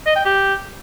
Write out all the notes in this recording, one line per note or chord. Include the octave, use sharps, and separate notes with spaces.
D#5
G5
G4